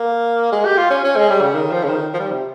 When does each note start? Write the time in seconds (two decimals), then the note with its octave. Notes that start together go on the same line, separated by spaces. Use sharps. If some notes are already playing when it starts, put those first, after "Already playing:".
Already playing: A#3
0.52 G#3
0.65 G4
0.78 F4
0.90 C#4
1.04 C#4
1.16 G#3
1.30 G3
1.42 C#3
1.55 D#3
1.71 F3
1.84 C#3
1.89 D#3
2.14 F3
2.20 G3
2.31 C3